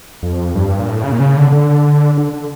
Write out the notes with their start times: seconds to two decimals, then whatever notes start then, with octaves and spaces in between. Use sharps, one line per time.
0.23 F2
0.55 G2
0.79 A#2
0.88 A2
1.04 C#3
1.12 A#2
1.20 C#3
1.37 D3
1.52 D3
2.17 D3
2.33 D3